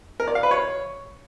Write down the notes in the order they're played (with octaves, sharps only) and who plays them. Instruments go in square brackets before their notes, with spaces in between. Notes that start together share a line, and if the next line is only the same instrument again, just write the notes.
[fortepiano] A#4
D5
F5
B4
C#5